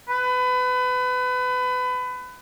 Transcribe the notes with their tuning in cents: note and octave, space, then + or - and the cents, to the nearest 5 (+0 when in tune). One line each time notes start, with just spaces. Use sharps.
B4 +25